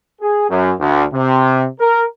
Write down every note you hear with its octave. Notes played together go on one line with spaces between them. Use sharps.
G#4
F#2
D2
C3
A#4